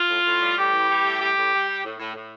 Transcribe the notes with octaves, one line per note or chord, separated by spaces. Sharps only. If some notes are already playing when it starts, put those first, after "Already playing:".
Already playing: F4
A2
A2
G3
A2 G4
E3
G3
A2
G3 G4
A2
G3
G3
A2
A2
A2